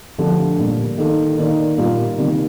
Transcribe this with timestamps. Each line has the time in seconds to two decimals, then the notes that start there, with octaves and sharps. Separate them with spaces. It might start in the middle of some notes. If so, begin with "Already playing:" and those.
0.18 D3 F3 A3 D4 G4
0.58 A#2 G3 A#3
0.98 D#3 A#3 D#4 A4
1.38 D#3 A#3 D#4 A#4 D5
1.77 A#2 G3 A#3 F4 A#4
2.18 C3 D#3 G3 A#3